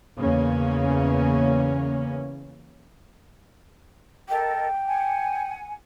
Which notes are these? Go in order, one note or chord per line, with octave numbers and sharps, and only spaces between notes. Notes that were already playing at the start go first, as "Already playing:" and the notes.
E2 C#3 A#3 C#4
A4 A#4 D#5 G5
F#5 G#5